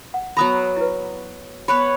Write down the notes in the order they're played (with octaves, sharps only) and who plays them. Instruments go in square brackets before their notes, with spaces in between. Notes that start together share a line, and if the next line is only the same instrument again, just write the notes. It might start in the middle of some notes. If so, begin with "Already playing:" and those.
[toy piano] F#5
[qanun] F#3 B3 A#5 [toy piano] B5 D#6
[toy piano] E4 B4
[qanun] B3 B4 C#5 [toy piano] B5